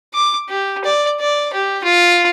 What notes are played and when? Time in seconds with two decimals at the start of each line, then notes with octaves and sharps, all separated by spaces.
0.14 D6
0.49 G4
0.84 D5
1.20 D5
1.53 G4
1.84 F4